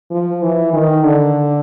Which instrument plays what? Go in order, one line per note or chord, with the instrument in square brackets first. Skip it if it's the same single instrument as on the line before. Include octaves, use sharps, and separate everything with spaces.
[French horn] F3
E3
D#3
D3